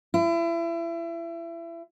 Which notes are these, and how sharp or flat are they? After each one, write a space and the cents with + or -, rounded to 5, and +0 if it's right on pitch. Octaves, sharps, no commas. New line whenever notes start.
E4 +30